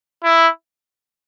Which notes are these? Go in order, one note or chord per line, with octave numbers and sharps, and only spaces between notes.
E4